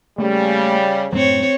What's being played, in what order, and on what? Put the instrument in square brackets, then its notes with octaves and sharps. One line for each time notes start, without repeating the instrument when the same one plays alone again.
[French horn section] C#3 G3 [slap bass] A3 A#3
[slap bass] F#2 A2 F#3 [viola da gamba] C4 C#5